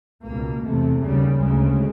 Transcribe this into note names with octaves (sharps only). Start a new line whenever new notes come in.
C#2 B2 A#3
E2 C3 A3
D#2 C#3 G3
D2 C#3 G#3